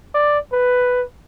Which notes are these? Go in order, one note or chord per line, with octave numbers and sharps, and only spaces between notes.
D5
B4